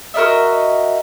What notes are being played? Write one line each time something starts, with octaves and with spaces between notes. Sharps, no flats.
F#4 A#4 D#5 E5